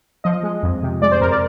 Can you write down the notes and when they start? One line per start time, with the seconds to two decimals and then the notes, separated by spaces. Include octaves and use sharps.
0.24 F3 D#5
0.43 G#3
0.63 F2
0.83 C3
1.02 G#3 D5
1.11 C5
1.21 F2 A#4
1.31 D5